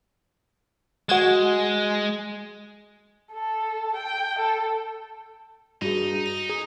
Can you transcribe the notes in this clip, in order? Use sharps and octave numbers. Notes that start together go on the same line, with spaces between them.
G#3 F#4 G#6 E7
A4
G5
A4
G2 D#4 F#4 G#4
A#6
G#4 A#5 D#6 G7